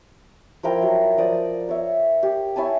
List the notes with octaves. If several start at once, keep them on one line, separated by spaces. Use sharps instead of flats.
F3 E4 A#4 G5
F#3
F3 D5 D#6
C#5 E5
G4
E4 C#5 G#5 A5